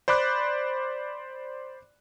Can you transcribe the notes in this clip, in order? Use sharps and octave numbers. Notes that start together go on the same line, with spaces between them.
C5 D5 B5 D6 F#6